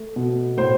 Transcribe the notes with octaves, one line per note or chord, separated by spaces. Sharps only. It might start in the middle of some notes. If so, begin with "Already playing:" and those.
Already playing: A3
B2
A2 C5